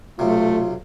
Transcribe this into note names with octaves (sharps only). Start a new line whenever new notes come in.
B1 C3 A3 F4